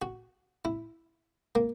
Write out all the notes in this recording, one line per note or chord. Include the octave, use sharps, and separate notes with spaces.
F#4
E4
A#3